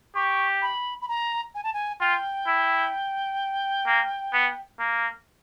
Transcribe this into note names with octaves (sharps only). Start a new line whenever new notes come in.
G4 C#6
B5
B5
A#5
G#5
A5
G#5
F4 G5
E4
A#3
B3
A#3